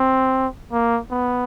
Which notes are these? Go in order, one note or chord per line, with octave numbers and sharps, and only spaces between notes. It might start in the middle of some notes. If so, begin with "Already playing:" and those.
Already playing: C4
A#3
B3